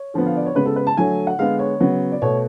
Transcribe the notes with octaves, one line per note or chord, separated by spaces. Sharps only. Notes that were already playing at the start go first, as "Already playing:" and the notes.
Already playing: C#5
D3 F3 B3
F5
D5
C#5
C#3 G#3 B3 B4
A4
B4
A5
D3 F#3 A3 G#5
F#5
D3 G#3 B3 F5
C#5
C#3 F#3 B3
D5
B2 A3 C#5